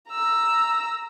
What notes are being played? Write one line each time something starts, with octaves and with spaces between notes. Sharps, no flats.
A#5 E6